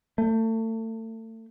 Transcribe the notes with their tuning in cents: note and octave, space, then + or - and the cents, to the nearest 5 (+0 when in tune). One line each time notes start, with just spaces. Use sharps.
A3 +30